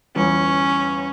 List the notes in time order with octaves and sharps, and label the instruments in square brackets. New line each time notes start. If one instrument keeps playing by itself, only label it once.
[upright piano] G1 E2 [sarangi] C#4